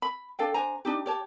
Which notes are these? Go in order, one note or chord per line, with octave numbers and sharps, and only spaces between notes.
B5
D4 A4 F5 G5
D4 C5 G#5 A#5
D4 D#4 G4
G4 C#5 A5